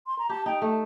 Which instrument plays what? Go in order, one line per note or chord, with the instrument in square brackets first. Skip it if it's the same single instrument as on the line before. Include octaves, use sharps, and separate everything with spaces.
[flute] C6
A#5
[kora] G4 [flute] A5
[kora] D#4 [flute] G5
[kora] A3 [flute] A5